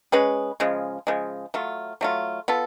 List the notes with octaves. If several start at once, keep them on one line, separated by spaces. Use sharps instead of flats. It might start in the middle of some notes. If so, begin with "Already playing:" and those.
G#3 C#4 G#4 B4
C#3 F3 G#3
C#3 F3 G#3
F#3 A3 F4
F#3 A3 F4
B3 F4 A4